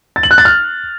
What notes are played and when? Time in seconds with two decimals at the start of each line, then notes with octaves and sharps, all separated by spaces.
0.16 A6
0.23 F#7
0.31 F#6
0.38 A6
0.45 F6